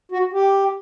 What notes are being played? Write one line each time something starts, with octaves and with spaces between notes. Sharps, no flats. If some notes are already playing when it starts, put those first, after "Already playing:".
F#4
G4